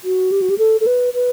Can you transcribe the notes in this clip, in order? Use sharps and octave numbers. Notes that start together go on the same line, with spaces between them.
F#4
G4
F#4
G4
A4
A4
B4
B4